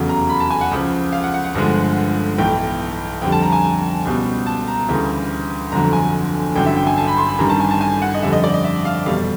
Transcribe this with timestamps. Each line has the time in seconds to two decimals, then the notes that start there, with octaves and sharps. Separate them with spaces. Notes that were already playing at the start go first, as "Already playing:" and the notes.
Already playing: F1 E2 C#3 F#3
0.09 A#5
0.29 B5
0.40 A5
0.50 G#5
0.61 F#5
0.71 C#2 C#3 F3
1.12 F5
1.24 F#5
1.34 F#5
1.44 F#5
1.55 G1 G2 D3 F3 G#3
2.38 B1 A2 E3 G5
3.22 F2 D3 G3 G5
3.32 A5
3.42 A#5
3.52 G#5
4.05 C#2 B2 G3
4.46 A5
4.68 A#5
4.88 D2 C#3 E3 G3
5.72 G1 F2 D3 F#3 A#5
5.93 G#5
6.56 A1 G2 D3 F#3 G5
6.66 E5
6.77 G5
6.87 G#5
6.97 A5
7.07 B5
7.18 C6
7.29 B5
7.39 A1 G2 D#3 G3 A#5
7.49 A5
7.60 G#5
7.71 A5
7.81 G#5
8.02 F#5
8.14 D#5
8.22 F2 D3 G3 E5
8.33 D#5
8.44 D5
8.54 D#5
8.64 E5
8.85 F5
9.06 F1 E2 B2 G3 F5